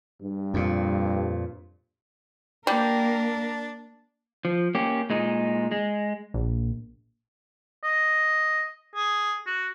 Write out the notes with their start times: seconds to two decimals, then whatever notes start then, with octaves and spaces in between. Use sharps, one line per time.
0.22 G2 G3
0.54 F2 A#2
2.67 G3 A#3 D4 A#4
4.45 F3
4.75 A#3 C#4 G4
5.10 A#2 G#3 D#4
5.72 G#3
6.34 A#1
7.83 D#5
8.95 G#4
9.46 F#4